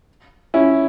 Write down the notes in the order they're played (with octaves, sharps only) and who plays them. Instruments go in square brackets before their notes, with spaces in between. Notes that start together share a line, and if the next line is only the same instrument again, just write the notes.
[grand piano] C#4 E4